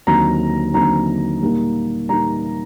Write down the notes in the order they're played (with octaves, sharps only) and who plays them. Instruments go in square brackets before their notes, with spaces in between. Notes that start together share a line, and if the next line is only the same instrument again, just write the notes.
[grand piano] D#2 D3 F#3 C4 D#4 A#5
D#2 D3 F#3 C4 D#4 A#5
A#2 G3 A#3 D#4
A#2 G3 A#3 D#4 A#5